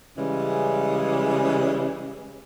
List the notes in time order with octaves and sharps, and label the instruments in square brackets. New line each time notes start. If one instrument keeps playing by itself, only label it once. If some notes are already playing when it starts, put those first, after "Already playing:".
[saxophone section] C#3 E3 G3 G#3 C#4